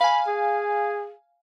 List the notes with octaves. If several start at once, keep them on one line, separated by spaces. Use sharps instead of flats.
F5 G#5 B5
G#4